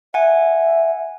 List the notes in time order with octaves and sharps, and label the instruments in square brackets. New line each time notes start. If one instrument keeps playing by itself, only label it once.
[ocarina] E5 [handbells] F#5 G#5